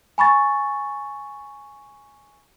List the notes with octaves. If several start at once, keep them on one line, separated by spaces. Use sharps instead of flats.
G#5 B5 C#6 A6